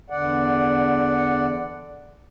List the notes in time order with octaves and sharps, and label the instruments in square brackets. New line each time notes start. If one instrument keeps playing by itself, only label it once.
[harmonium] E2 D3 D5 F#5